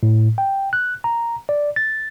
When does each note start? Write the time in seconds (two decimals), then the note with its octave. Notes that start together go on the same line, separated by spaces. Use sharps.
0.03 A2
0.38 G5
0.73 F#6
1.04 A#5
1.49 D5
1.76 A6